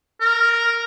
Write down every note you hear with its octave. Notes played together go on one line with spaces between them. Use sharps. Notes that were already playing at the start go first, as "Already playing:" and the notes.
A#4